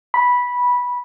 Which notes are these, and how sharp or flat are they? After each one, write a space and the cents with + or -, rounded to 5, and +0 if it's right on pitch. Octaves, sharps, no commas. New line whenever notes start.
B5 -10